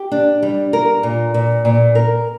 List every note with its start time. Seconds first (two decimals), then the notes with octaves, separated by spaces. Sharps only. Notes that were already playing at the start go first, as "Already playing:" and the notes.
Already playing: G4
0.12 D4
0.43 G3
0.73 A#4
1.03 A#2
1.34 A#2
1.65 A#2
1.95 A#4